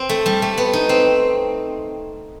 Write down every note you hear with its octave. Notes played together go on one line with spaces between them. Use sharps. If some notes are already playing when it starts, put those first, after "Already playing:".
Already playing: C4
A3
G3
A3
B3
D#4
C4